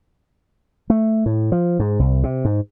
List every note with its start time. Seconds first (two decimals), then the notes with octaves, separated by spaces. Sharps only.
0.90 A3
1.26 A2
1.52 F3
1.79 G#2
1.99 C2
2.24 C3
2.45 G#2